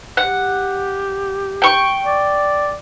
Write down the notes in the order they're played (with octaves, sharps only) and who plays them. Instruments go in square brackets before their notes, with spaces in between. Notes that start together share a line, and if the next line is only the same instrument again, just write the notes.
[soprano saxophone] G4 [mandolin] F#5
[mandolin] G5 C#6
[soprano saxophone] D5